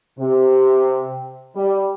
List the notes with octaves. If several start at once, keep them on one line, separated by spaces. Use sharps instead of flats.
C3
G3